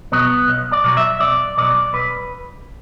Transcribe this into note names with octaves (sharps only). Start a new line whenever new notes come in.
B2 F#3 B3
B1
D5
B2 F#3
E5
B1 D5
B2 F#3 D5
B1 B4